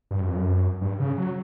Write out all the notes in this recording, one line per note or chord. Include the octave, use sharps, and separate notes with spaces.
G2
F#2
F2
F#2
G2
C#3
F#3